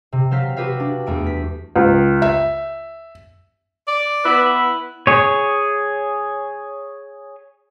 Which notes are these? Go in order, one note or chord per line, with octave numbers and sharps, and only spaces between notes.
C3
F#3 C4 C5 F5 B6
F#4 G4 B4 E5 F5
D4
E2 A3 D7
B6
C#2
E5
D5
B3 E4 B4
G#4 C#5